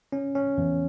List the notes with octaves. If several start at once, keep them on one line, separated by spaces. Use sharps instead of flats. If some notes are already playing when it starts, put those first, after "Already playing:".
C#4
C#4
E2